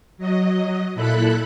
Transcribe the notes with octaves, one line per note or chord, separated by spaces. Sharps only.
F#3 D#5
A#2 E4 A4 B5 F#6